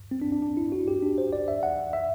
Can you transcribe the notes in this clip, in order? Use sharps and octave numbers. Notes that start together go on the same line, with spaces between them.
C4
D4
D4
D4
E4
F#4
G4
D4
C5
D5
E5
F#5
E5